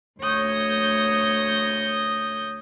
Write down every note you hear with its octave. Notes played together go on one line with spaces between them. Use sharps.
D2 C#5 D#6 G6 A#6